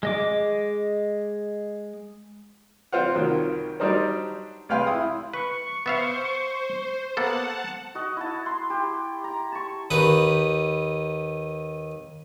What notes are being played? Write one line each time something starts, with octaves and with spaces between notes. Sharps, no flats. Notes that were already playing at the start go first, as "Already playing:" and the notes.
G#3 D#5 D6
C4 F4 C5 F5 F#5
C2 D#3 F#3 F4
F#3 G3 D4 D#4 A#4 C5
C2 G#3 B4 F5 G5 C6
E4 D#6
B4 C#6
B3 C5 E5 F5
A#3 B3 A4 F#5 A5
F#4 D#5
E4 F#5 A5
C6
G4
A#5
A5 C#6
D#2 D#4 B4